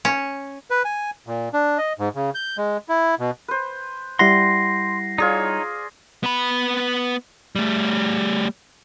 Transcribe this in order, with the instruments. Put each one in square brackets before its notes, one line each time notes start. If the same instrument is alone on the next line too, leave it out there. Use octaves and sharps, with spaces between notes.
[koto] C#4
[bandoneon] B4
G#5
A#2
D4
D#5
G#2
C#3
G6
G#3
E4
B2
[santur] B4 C5
[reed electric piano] G3 E4 F#5 [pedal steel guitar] C6 [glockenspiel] A#6 C7
[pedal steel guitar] D#4 C#5 [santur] F4 G#4 D5
[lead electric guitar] B3 B5
G3 A3